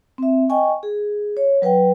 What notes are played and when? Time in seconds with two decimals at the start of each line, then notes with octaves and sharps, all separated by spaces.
0.18 C4 E5
0.49 D#5 G5 G#5 C#6
0.83 G#4
1.37 C#5
1.62 F#3 B4 F#5 G5